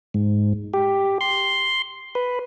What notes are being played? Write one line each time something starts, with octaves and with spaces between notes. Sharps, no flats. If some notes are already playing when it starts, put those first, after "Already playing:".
G#2
G4
C6
B4